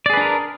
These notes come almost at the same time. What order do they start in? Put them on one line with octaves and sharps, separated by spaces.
D5 G#4 B4 D4 A#4